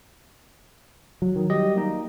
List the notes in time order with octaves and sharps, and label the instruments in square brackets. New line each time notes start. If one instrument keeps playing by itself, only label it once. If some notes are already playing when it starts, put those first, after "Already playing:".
[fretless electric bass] F#3
[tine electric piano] D#3
G3 G4 D#5
A#3 D#4